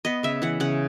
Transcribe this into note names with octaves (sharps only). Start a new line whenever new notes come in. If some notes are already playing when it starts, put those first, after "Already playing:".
B3 D#5
C#3 E5
E3 F#5
C#3 F#5